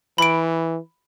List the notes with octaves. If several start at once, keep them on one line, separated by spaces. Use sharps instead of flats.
E3 B5 D7